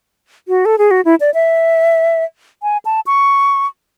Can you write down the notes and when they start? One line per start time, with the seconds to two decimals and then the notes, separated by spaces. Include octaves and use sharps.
0.48 F#4
0.65 A4
0.78 G#4
0.91 F#4
1.05 E4
1.20 D5
1.34 E5
2.63 G#5
2.85 A5
3.06 C#6